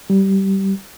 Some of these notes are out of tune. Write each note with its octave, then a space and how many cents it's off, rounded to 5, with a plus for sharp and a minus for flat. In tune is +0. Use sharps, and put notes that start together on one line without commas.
G3 -15